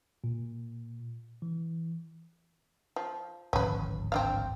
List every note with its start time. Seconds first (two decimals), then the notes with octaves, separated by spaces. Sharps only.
0.24 A#2
1.42 E3
2.96 F3
3.53 D1 G#1 F3 C#4 B4
4.12 C4 D4 F5